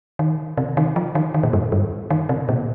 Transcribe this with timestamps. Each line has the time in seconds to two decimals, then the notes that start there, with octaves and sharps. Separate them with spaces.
0.19 D#3
0.57 C3
0.77 D#3
0.96 F3
1.15 D#3
1.34 D#3
1.43 A#2
1.53 G2
1.72 G2
2.10 D#3
2.29 C3
2.49 A#2